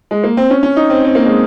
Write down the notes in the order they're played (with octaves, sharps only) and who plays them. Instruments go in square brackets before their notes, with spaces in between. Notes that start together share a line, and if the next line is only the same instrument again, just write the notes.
[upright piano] G#3
A#3
C4
C#4
C#4
D#4
C4
C4
A#3
G#3